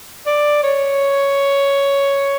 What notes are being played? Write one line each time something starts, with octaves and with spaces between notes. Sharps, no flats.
D5
C#5